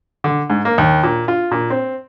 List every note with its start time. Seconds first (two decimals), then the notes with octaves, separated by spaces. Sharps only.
0.24 D3
0.50 G#2
0.65 A#3
0.78 D#2
1.03 A#2
1.28 F4
1.52 A#2
1.70 C4